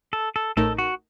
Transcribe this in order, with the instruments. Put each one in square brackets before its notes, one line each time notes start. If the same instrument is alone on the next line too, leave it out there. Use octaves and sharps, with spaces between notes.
[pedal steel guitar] A4
A4
[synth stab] A1 A2 A3 D#4 A#4 [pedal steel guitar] A4
[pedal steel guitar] F#4